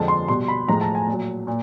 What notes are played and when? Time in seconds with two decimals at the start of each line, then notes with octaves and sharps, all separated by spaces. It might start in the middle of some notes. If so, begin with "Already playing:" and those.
Already playing: F2 D3 F3 G#3 A5
0.08 C6
0.28 B2 G3 C6
0.48 B5
0.68 A2 F3 G#3 A#5
0.81 A5
0.95 G#5
1.07 A#2
1.13 F#3
1.47 A#2